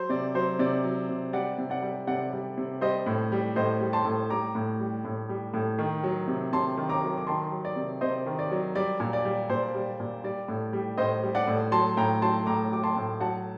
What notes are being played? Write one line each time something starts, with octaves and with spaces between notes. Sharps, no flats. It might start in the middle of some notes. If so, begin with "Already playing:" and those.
Already playing: F#3 C5
C3 D5
F#3 C5
C3 D5
F#3
C3
G3 D5 F#5
C3
D5 F#5
G3
C3 D5 F#5
G3
C3
G3 C5 D#5
A2
G3
A2 C5 D#5
G3
A5 C6
A2
G3 A#5 D6
A2
G3
A2
G3
A2
D#3
F#3
C3
C3 A5 C6
D#3
A#5 D6
F#3
D6
D#3 A5 C6
F#3
D5
C3
C3 C5 D#5
D#3
D5
F#3
G3 D5
A#2
D5
G3
A#2 C5
G3
A#2
G3 D5
A2
G3
A2 C5 D#5
G3
D5 F#5
A2
F#3 A5 C6
A2 G5 A#5
F#3 A5 C6
A2 A#5 D6
F#3 D6
A5 C6
A2
F#3 F#5 A5